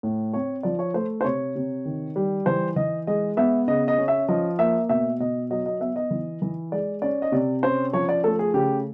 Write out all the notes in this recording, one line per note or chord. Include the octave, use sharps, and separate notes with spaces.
A2
C4 C#5
F3 D5
C#5
A3 C5
C5
C3 C#5
C3
D#3
G3
E3 C5
E3 D#5
G#3 D#5
B3 E5
C#3 D#5
D#5
C#4
E5
F3 D#5
A#3 E5
B2 E5
B2 D#5
F#3 D#5
D#5
B3 E5
D#5
E3
E3
G#3 D5
C#4 D5
D#5
C3 D5
C#4 C5
F3 C#5
D5
A3 A4
G#4
C#3 G4